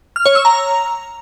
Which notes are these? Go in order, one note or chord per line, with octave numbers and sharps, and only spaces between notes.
F6
C#5
E6
A#5